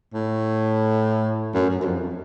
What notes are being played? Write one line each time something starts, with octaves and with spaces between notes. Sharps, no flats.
A2
F#2
F#2
F#2
F2